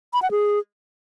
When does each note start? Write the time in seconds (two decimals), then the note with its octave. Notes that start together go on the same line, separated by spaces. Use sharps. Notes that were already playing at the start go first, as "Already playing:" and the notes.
0.14 B5
0.22 F#5
0.31 G#4